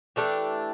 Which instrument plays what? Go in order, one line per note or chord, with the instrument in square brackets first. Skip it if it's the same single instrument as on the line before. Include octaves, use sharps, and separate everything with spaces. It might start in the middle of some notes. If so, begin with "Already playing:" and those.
[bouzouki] E3 A3 D4 G4